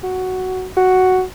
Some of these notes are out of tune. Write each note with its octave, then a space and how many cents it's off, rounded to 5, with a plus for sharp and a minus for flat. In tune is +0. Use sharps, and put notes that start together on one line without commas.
F#4 +5
F#4 +0